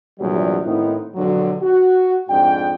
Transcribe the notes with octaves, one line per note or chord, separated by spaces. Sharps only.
A#1 E2 C3 F#3 G3
A2 D#3 B3 C4 D#4 E4
B1 F2 G#2 D3 F#3
F#4
F2 G#2 D4 G5